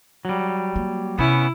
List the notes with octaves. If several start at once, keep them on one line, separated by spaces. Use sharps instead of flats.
F#3 G3
A#3
C3 B3 C#4 E4